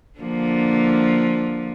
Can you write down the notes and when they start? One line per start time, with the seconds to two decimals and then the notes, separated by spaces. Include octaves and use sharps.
0.19 D3 F3 A#3